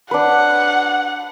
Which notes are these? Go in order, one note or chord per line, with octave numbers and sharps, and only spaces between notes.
D4 B4 F#5